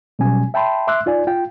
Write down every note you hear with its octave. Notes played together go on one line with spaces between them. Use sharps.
B2 F#3 G3 C#4 G#5
E5 G5 A5 B5 C6
E5 C6 D6 E6 F#6
D#4 F4 D5 G#5
F4 G5